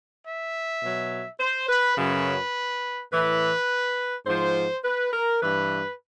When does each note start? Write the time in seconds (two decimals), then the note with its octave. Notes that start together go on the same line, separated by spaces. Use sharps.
0.25 E5
0.82 B2 F#3
1.40 C5
1.69 B4
1.97 F#2 C#3 F#3 B4
3.11 A2 E3 B4
4.26 G#2 F3 C5
4.84 B4
5.13 A#4
5.42 G2 E3 B4